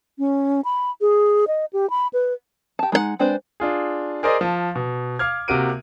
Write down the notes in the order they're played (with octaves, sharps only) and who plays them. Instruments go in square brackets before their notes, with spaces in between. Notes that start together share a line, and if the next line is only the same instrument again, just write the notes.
[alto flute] C#4
B5
G#4
D#5
G4
B5
B4
[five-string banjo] G4 A5
G#3 D#4 A#4 F#5
G#3 C4 D4 B4 C5
[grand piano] D4 F4 G#4
G#4 A#4 C5 D5 D#5
F3 A5
B2
F5 D6 F6 G#6
C3 A#3 F#4 A#4 D7 D#7